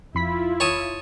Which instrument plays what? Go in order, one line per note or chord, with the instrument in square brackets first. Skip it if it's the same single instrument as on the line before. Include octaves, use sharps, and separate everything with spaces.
[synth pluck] F2 B5 B6 [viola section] E4 F4
[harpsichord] C#5 A5 D#6